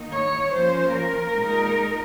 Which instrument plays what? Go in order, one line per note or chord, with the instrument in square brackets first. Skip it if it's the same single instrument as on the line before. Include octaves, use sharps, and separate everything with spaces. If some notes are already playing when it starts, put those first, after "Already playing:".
Already playing: [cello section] D#3 A#3 D#4
C#5
F3 A#3 C#4 F4 C5
A#4
A#2 G#3 D#4